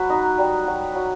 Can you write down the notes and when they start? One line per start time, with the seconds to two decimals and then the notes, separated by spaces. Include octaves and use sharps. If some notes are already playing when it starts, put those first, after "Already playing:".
Already playing: F#3 B4
0.10 D#4
0.38 G3
0.67 F#3
0.95 F#3